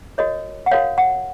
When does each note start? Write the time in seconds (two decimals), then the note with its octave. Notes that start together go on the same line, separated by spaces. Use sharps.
0.18 F#4 A#4 C#5 D#5
0.66 F#5
0.71 F#4 A#4 C#5 F5
0.98 F#5